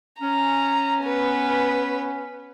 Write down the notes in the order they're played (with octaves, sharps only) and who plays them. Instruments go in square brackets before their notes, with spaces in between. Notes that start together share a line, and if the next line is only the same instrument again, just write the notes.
[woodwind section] C#4 [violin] A#5
[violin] B3 B4